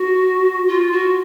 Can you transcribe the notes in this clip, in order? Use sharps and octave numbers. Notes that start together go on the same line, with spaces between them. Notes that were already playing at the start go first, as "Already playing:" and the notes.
Already playing: F#4
F4
F#4